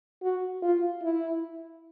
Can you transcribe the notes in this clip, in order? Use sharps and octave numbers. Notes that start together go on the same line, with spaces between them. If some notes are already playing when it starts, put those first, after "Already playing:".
F#4
F4
E4